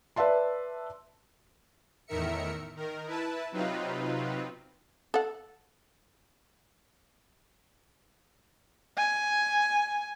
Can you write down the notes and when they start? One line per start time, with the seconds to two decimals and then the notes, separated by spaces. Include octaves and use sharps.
0.16 B4 D5 E5 A5 C6
2.07 E2 A2 D#3 A#4 E5 C#7
2.76 D#3 A#4
3.06 E4 B4 A5
3.52 C3 F#3 C4 D#4 F4 B4
5.14 A4 F#5
8.97 G#5